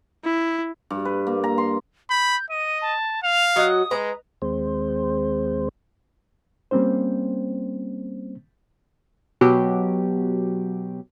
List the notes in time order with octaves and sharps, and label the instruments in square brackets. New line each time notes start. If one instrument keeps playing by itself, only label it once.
[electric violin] E4
[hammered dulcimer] G2
B4
A#3
A#5
C6
[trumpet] B5 [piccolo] G6
[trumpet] D#5 [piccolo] D#7
[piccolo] A5
[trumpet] F5 [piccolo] F7
[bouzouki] F#3 F#4 D#5 [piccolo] D#6
[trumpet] G#3 [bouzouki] B4 D#5 A#5
[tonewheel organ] D#2 G#3 C4 C5
[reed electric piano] G3 A#3 C4 C#4 C5
[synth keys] B2 F#3 G4